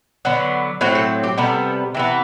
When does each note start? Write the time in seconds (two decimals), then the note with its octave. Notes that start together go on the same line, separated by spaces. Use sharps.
0.25 D3 F#3 B3
0.81 A2 F#3 C4 F#4
0.95 A4
1.23 G4
1.38 C3 G3 B3 A4
1.95 C3 E3 B3